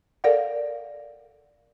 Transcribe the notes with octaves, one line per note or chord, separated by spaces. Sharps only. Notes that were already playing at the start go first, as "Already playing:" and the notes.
A4 A#4 D5 F5 F#5